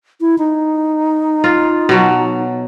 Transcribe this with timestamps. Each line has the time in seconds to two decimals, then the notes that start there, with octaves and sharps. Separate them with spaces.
0.21 E4
0.38 D#4
1.44 F4
1.89 B2 F#3